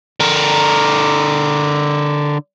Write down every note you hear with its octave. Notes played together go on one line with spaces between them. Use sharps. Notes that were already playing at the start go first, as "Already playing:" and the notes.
D3 A#4